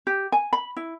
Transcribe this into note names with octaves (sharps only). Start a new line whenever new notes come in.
G4
G#5
B5
E4